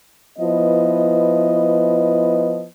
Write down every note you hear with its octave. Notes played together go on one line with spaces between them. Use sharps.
F3 B3 E4 B4 D#5